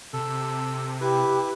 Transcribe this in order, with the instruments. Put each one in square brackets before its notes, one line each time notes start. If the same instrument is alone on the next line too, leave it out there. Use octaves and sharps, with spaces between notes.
[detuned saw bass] C3 [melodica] A4
[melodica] E4 B4 [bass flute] G4